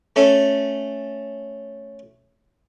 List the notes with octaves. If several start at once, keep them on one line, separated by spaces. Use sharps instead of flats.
A3 C#4 A4